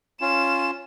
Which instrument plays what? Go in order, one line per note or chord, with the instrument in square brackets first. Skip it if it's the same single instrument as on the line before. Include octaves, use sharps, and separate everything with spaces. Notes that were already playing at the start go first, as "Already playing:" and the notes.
[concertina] C#4 F4 [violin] E7